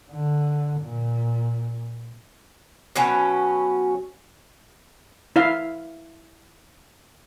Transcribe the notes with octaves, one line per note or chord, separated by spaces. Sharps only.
D3
A#2
B2 F#3 C#4
E4 E5 F5